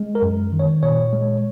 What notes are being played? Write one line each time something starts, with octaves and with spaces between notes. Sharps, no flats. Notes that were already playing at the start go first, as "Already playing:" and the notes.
Already playing: G#3
A#4
F#2
D#3
C#5
A#2 C#5
G#3